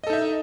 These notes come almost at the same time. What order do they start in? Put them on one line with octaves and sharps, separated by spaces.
D#5 A4 D#4 E5